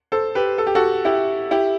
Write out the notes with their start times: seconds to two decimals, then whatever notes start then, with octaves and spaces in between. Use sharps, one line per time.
0.12 A4 C5
0.35 G4 B4
0.58 A4
0.67 G4
0.75 F#4 A4
1.05 E4 G4
1.51 E4 G4